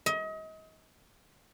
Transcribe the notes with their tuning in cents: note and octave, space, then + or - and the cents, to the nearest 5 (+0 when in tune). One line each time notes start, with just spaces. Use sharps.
D#5 +35